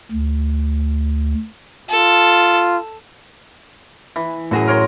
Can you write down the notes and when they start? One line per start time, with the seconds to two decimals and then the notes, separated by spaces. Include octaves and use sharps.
0.12 D2
1.89 F4 A4
4.16 E3
4.51 F#2 A2 F#4 G#4 A#5
4.67 A#4 C#5 C6